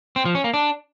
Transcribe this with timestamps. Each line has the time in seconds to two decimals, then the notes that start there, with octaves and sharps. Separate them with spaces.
0.16 C4
0.25 F3
0.35 C#4
0.44 A#3
0.54 D4